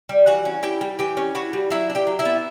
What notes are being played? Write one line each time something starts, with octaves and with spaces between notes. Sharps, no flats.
G3
E3 F#4 F#5
C#4
E4 G4 G5
G3
E3 G4 G5
C#4
E4 F#4 F#5
G3
F#3 E4 E5
D4
G4 G5
F#3
E4 E5
B3